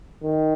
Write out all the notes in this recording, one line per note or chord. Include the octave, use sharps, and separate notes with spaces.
D#3